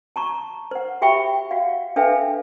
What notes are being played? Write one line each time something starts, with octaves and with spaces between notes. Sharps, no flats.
A5 A#5 C#6
C5 F#5
F#4 G4 E5 G5 B5 C#6
F#4 F5 F#5
D4 A4 B4 E5 F5 G5